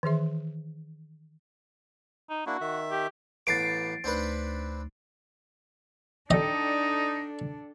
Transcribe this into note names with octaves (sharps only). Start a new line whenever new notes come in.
D#3 E3 G#4 E5
D#4
A#3 D4 E4 F#4
D#3 E5
G4
A1 B3 D6 A6 C7 D7
D2 A3 C4 D4 D#4 B4
D4 D#4 A4 D5 D#5 G5